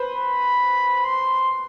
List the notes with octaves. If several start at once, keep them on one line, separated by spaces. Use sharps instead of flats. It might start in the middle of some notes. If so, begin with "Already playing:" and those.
Already playing: B4 C5
B5
C6